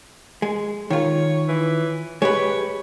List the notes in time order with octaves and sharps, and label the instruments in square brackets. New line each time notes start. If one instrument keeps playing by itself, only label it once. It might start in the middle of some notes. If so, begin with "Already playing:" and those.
[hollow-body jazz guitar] G#3
[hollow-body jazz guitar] D#3 F4 [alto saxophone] C#5
[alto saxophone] E3
[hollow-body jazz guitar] G#3 G4 B4 [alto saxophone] C#5